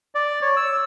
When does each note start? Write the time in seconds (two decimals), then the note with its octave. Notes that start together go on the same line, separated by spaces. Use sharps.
0.15 D5
0.42 C#5
0.57 E6